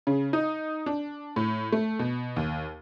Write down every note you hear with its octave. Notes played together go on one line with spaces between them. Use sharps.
C#3
D#4
D4
A2
A3
B2
D#2